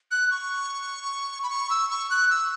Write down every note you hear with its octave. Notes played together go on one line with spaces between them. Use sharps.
F#6
C#6
B5
C#6
E6
C#6
F#6
E6